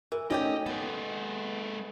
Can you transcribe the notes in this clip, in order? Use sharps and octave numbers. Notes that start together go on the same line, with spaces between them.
E3 A#4
A3 C#4 D#4 G4 D5 D#5 G5
G#3 B3 A4